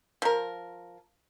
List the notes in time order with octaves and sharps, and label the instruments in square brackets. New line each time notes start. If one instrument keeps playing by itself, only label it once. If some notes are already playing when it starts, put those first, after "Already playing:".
[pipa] F3 A#4